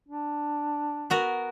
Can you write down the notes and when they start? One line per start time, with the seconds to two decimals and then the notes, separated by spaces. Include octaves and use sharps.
0.08 D4
1.10 B3 F#4 A#4